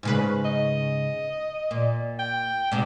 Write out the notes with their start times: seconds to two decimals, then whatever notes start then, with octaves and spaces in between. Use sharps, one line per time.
0.03 G#2 C#3 B4
0.45 D#5
1.71 A#2
2.20 G5
2.72 G#2 C3